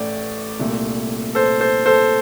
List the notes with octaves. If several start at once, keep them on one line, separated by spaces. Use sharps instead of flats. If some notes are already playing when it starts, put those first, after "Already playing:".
Already playing: A1 A3 D5
C2 A#2 A3
A4 C5
A4 C5
A4 C5